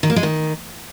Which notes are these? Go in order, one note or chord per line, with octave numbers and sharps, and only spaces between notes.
D#3
A#3
G#3
D#3